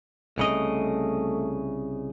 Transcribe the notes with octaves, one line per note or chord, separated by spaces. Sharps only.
C2 C#3 A3 D#5